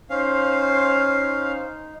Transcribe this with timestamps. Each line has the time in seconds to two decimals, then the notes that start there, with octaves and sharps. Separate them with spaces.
0.10 C#4 D#4 C5 F5